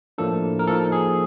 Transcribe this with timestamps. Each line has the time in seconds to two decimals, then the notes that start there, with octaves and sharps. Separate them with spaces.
0.18 A2 F3 A#3 D4 A4
0.59 A#4
0.67 F3 A#3 D#4 A4
0.92 G#4